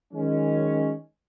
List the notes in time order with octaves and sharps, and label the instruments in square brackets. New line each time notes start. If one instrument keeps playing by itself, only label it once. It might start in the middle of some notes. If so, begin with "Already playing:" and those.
[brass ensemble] D#3 F#3 G#3 C#4